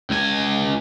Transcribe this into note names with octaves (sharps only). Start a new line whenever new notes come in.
C#2 G#5